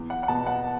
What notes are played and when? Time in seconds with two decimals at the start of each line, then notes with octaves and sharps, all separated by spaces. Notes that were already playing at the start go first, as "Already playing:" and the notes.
Already playing: E2
0.10 F#5
0.23 F#5
0.28 B2 B3 A5
0.47 F#5